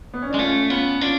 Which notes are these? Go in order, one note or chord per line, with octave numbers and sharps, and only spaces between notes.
B3
C#4
D4
G#3
A3 C#4 F4
B3 C#4 F4
C#4 D4 F4